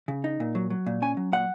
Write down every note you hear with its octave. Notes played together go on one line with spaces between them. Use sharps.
C#3
D#4
A#2
F#3
F#3
A#2
C#4 G#5
F#3
A#2 F#5